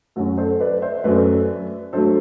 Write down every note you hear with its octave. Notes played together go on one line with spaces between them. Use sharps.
F#2 F#3 A3 F#4 A4
A4 C5
B4 D5
C5 E5
F#2 F#3 A3 B4 D5
G2 F#3 A3 A4 C5